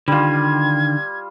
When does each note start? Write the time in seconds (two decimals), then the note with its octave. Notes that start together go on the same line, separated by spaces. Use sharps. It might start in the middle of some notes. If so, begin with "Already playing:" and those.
0.08 D3 D#3 G3 F4 G#6